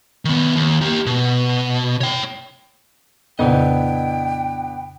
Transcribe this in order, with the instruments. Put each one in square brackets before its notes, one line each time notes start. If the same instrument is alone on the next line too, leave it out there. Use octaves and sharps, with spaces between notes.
[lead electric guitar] D#3 B3
D#2
A#3 G4
B2
C#5 G5
[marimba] F2 A#2 C#3 [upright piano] B3 D4 [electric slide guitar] E4 D#5 [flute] G5